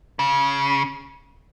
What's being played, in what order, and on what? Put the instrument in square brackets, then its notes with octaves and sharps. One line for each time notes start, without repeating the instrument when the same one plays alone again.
[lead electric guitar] C#3